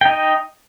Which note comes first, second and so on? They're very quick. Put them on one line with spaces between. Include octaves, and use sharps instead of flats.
G5 D#4 D#5